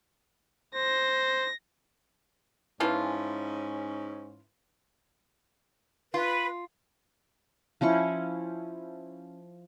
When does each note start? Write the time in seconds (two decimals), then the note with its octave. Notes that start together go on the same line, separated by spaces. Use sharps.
0.75 C5 A#6
2.80 G#2 E3 F3 C#4 F4
6.14 F4 B4
7.81 F3 C#4 E4 C#6